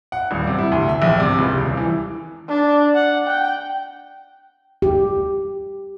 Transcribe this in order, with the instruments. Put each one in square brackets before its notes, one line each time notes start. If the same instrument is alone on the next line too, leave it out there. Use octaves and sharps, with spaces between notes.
[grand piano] F#5
D#1
C3
E4
D2
E5
A#1
C3
C#2
D#1
E3
[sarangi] D4
F#5
G5
[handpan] G4